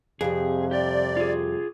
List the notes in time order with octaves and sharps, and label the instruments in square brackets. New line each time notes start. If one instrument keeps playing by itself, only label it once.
[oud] F2 G3 [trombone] C3 [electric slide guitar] G#4
[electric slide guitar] G4 [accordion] D5
[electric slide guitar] F4 G#4